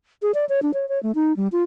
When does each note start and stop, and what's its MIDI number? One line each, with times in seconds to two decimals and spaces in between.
0.22 0.32 68
0.34 0.45 74
0.49 0.60 73
0.62 0.71 62
0.74 0.88 73
0.89 1.01 73
1.03 1.12 57
1.15 1.35 63
1.37 1.48 55
1.52 1.63 65